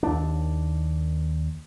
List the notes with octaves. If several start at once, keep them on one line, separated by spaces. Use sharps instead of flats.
D#2 D4